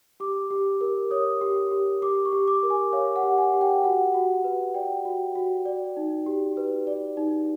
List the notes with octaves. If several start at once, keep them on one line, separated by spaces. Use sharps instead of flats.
G4 D6
G4
A#4
C#5 D#6
G4
G4
G4 D6
C#6
G4
D6
A#4
G#5
C#5 F5
F#5
G4
G#5
G4
G5
F#4 F#5
F#4
B4
D5 G5
F#4
F#4
D5
D#4
G4
B4
D5
D#4